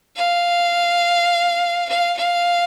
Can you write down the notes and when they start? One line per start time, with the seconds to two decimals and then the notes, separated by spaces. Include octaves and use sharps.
0.16 F5
1.89 F5
2.17 F5